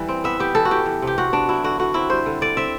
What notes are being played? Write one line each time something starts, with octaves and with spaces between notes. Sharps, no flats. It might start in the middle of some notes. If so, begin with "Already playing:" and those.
Already playing: E3 G3
C4
B3 E5
B3 G4
E3 A4
F#4
E3 G4
E3
C3
G4
C3 F#4
B3 D4
F#3 E4
D3 F#4
D3 F#4
C4 E4
G3 C5
D3
D3 D5
C4 E5